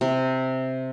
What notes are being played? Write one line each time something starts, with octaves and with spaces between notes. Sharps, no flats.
C3